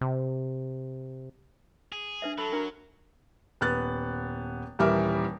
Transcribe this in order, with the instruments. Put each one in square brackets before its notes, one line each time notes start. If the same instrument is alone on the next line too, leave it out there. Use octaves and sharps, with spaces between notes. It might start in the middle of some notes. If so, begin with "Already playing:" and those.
[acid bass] C3
[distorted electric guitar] G#4
[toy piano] D4 B4 E5
[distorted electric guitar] F#3 [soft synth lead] A4 [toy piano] B5
[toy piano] D4 F#4 [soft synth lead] A#4
[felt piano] D#1 B3 F#6 A6
D#1 E3 G3 A#4 E5 D6